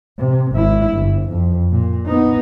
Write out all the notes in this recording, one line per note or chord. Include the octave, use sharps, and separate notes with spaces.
C3
G#1 E4
G1
F2
A#2
B3 D#4